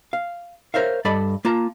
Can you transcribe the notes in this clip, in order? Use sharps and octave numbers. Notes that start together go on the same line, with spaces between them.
F5
A#4 C5 C#5 E5 F5
G2 A4 D5 D#5 A5 B5
A#3 F4 A5 A#5